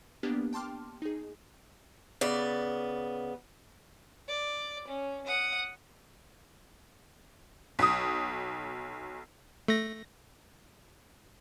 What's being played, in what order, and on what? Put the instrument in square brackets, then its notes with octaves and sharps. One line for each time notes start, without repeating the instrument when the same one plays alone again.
[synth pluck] A#3 B3 D4 G4
G5 A5 C6 D6 F6
D#4 G#4
[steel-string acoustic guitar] C#3 B3 D5
[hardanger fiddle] D5
C#4
F#5 D#6
[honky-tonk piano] B1 D#6
[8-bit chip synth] A3 A#6